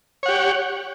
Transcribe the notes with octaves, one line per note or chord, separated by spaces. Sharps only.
G4 C#5 F#5